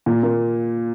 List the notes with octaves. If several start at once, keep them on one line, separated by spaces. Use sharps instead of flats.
A#2
A#3